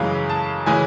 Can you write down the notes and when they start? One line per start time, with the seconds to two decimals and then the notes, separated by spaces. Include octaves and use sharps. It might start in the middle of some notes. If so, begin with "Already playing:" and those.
Already playing: F#2 C#3 E3 G#3 F5
0.29 A5
0.66 C#3 E3 G#3 G#5